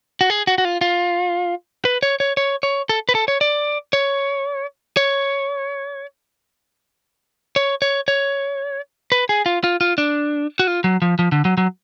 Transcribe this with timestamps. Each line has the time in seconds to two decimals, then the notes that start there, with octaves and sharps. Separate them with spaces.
0.21 F#4
0.30 G#4
0.47 F#4
0.58 F#4
0.65 F4
0.81 F4
1.85 B4
2.03 C#5
2.20 C#5
2.37 C#5
2.63 C#5
2.89 A4
3.09 B4
3.15 A4
3.28 C#5
3.41 D5
3.93 C#5
4.97 C#5
7.56 C#5
7.82 C#5
8.08 C#5
9.12 B4
9.29 G#4
9.46 F4
9.64 F4
9.81 F4
9.98 D4
10.59 F#4
10.67 F4
10.84 F#3
11.02 F3
11.19 F3
11.32 D3
11.45 F#3
11.58 F#3